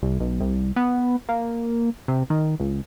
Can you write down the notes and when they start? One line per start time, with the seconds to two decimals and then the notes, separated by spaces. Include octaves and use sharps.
0.02 C2
0.20 B1
0.41 C2
0.76 B3
1.29 A#3
2.08 C3
2.30 D#3
2.60 C#2